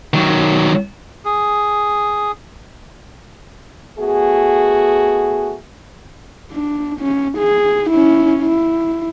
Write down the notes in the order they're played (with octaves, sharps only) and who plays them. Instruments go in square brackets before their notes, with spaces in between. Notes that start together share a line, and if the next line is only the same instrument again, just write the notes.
[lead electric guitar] D#3 F#3
[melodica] G#4
[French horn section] A3 B3 F#4 G#4
[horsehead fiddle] D4
C#4
G#4
C#4 E4
E4